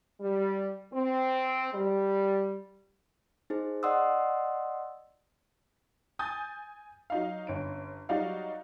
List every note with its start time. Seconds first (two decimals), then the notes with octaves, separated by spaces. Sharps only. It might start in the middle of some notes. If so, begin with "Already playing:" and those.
0.21 G3
0.93 C4
1.74 G3
3.50 D#4 G#4 C5
3.83 D5 D#5 F#5 C6 D#6 E6
6.19 G#5 D#6 G6 A6
7.10 F#3 D#4 F5
7.47 G1 C#4 D7
8.09 F#3 G3 D#4 F#4 D5 F5